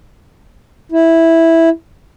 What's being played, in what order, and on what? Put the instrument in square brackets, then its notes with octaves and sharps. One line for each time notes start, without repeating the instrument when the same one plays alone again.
[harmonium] E4